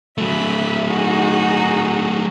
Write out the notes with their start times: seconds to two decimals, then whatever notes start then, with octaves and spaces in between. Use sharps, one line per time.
0.18 F#3 A3 E5 B5
0.86 D#4 F#4 G#4